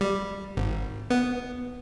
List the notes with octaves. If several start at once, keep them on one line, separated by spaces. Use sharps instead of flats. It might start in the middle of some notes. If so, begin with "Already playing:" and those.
G3
G#1
B3